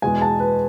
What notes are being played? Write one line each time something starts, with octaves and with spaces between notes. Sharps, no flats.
E2 B2 G#3 G#5
A5
B4